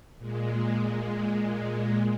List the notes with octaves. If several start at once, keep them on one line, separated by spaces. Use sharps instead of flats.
A#2 G#3